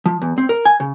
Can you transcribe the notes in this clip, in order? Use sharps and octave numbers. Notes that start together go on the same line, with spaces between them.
F3
E2
C4
A#4
G#5
C#3